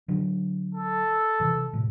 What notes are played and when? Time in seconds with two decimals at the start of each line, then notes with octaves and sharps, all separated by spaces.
0.08 D3 F#3
0.75 A4
1.40 C3 E3
1.73 A2 C3